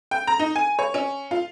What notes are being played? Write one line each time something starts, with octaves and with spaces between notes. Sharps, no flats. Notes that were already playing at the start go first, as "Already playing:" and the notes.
G5
A#5
D#4
G#5
C#5
C#4
F4